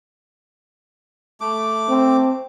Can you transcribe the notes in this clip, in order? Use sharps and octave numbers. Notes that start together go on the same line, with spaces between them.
A3 D6
C4